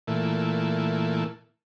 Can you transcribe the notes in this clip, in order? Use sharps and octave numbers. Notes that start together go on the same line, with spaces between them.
A#2 E3 A3